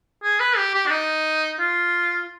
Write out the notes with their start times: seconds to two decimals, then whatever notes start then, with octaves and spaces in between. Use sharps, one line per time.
0.24 G#4
0.40 B4
0.57 G4
0.74 G4
0.87 D4
0.91 D#4
1.60 F4